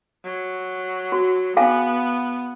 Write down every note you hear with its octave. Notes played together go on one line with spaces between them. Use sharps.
F#3
F#4
B3 G#4 F5 G#5